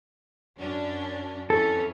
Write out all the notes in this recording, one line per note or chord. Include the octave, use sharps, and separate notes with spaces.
F#2 C#4 D4
F2 E3 C#4 A4